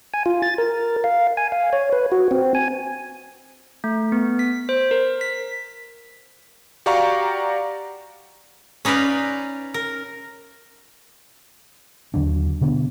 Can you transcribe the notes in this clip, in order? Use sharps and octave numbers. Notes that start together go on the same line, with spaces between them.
G#5
F4
A6
A#4
F5
G#5
F5
C#5
B4
F#4
C4
G#5
A3
B3
B6
C5
A#4
B6
F#4 G4 D5 F5 A#5 C#6
C#4 D#4 B4 D5 F5
A#4
D#2 D3 F#3 D4
B2 D3 B3 D4